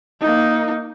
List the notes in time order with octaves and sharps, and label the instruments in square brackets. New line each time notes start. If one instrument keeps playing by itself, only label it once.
[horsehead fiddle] A#3 D#4